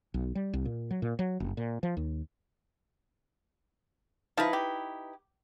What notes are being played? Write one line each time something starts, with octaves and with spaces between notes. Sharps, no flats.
B1
G3
C2
A#2
F#3
A#2
F#3
F#1
A#2
F3
D#2
F3 D#4 E4 B4
G4